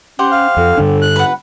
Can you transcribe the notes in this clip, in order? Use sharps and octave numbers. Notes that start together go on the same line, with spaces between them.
C#4 G4 C5 F#5
F5
F2 A4
G2 D3 D4
F#6
B4 F#5